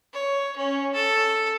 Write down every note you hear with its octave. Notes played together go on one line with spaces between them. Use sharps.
C#5
C#4
A4